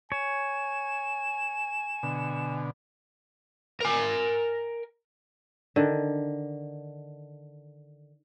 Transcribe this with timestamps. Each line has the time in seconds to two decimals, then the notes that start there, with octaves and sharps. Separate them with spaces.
0.12 C#5 G#5 E7
2.03 B2 D3
3.81 A#4 G#5
5.76 D3 D#3